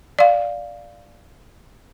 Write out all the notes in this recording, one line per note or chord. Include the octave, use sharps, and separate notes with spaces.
D5 F5